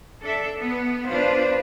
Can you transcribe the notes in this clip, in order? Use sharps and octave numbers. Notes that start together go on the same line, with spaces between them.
D4 A4 E5
B3
D4 F4 B4 C5